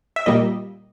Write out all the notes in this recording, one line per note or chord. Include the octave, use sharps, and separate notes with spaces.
E5
A#2 G3 A#3 D#5